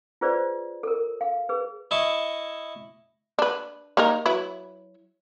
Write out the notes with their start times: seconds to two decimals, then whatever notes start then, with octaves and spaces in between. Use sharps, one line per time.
0.21 F4 G#4 B4 C5 D5
0.83 A4 A#4
1.21 F5
1.49 G#4 B4
1.91 E4 D#5 A5 C#6
3.39 D4 B4
3.97 A#3 D#4 A#4
4.26 F#3 E4 B4